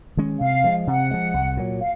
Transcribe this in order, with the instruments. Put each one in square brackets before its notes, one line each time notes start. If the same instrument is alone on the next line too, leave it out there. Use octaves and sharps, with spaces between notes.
[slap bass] D#3 G#3 C#4
[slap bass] C3 [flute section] F5
[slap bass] F3 G#3
[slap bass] C3 [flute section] F#5
[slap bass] F3 G#3
C2
A#2 F#3
[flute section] F5